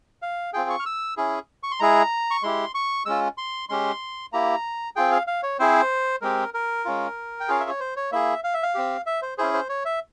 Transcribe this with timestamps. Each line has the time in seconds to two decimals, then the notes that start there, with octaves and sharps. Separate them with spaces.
0.22 F5
0.53 C4 F4 G#4 G5
0.70 C#6
0.79 F6
0.86 E6
1.17 C#4 E4 G#4
1.63 C#6
1.71 C6
1.80 G#3 E4 G#4 A#5
2.31 C#6
2.43 G#3 E4 G4 C6
2.75 C#6
3.06 G#3 C#4 F4 E6
3.38 C6
3.69 G#3 C#4 G4 C6
4.33 A#3 E4 G4 A#5
4.96 C4 F4 G#4 G5
5.12 F5
5.27 F5
5.43 C#5
5.59 C4 E4 G#4 C5
6.22 G#3 C4 G4 A#4
6.54 A#4
6.85 G#3 C#4 F4
7.40 G5
7.48 C#4 F4 G#4 F5
7.60 E5
7.70 C#5
7.80 C5
7.96 C#5
8.12 A#3 E4 G#4 E5
8.44 F5
8.54 E5
8.63 F5
8.75 C4 G4
9.06 E5
9.22 C5
9.38 C#4 E4 G#4 C5
9.53 C5
9.69 C#5
9.85 E5